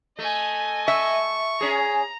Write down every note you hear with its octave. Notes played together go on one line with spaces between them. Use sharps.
A3 D#5 G#5
E5 C#6
C#4 G#4 A#5